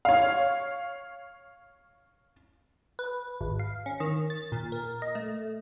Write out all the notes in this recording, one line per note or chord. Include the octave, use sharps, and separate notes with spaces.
C#5 F5
B4
G#1
F5
C#4
D#3
A6
A#2
A#4
D#5
A3